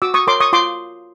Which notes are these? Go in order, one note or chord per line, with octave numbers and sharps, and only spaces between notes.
F#4 D6 E6
C#6 D#6
A#4 C#5 C6 D6
C#6 D#6
F4 C6 D6